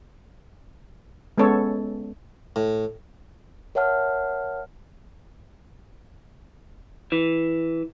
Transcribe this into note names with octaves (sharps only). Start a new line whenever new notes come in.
G#3 B3 C#4 A4 C#5
A2
A#4 C#5 E5 F#5 A5 F6
E3